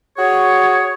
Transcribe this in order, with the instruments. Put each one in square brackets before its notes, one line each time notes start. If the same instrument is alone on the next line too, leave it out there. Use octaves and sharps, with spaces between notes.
[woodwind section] F#4 G#4 C#5